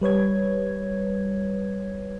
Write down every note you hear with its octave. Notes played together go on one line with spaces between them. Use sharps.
G3 B4 C#5 G#6